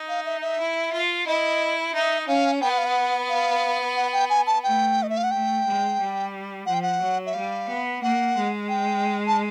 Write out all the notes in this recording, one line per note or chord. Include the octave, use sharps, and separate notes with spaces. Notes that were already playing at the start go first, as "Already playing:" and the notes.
Already playing: D#4
F5
E5
E5
E4
F4
E4 D#5
D#4 E5
C#4 F5
B3 G5
F#5
F5
F#5
F5
F#5
G5
G#5
A5
A3 G5
D#5
E5
F5
F#5
A3 G5
G#3
G3
F3 F#5
G5
F#5
F#3
E5
G3 F5
B3
A#3 F#5
G#3
G5
A5